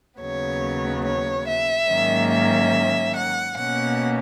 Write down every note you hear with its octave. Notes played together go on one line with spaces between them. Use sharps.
D#2 C#3 F#3 B3 C#5
C#5
E5
G#2 D#3 F#3 A#3 C#4
E5
F#5
B2 A#3 C#4 F#5